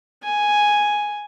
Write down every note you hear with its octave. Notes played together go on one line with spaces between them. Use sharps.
G#5